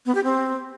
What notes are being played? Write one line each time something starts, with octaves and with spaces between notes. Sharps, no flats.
B3
G4
C4